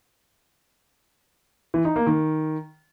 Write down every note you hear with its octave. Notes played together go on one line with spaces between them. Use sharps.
E3
D#4
A#3
D#3